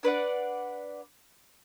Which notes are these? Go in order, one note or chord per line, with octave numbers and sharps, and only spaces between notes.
D4 B4 D5 F#5